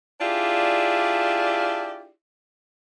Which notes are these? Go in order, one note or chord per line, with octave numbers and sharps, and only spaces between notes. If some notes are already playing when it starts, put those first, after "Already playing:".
D4 E4 F4 G4 G#4 D5